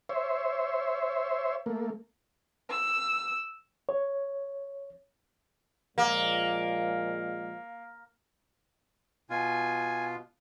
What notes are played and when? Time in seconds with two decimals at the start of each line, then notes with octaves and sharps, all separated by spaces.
0.09 C5 C#5 E5
1.66 A3 A#3
2.70 E6
3.89 C#5
5.98 A#2 F3 G#3 A#3
9.30 B2 F4 G#5